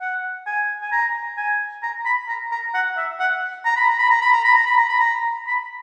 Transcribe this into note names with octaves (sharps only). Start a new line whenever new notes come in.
F#5
G#5
G#5
A#5
G#5
A#5
B5
A#5
A#5
F#5
E5
F#5
A#5
B5
A#5
B5
A#5
B5
A#5
B5
A#5
B5
A#5
B5
A#5
B5